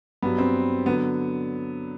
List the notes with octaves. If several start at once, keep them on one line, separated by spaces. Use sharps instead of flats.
G2 F#3 B3
C4
D3 F#3 B3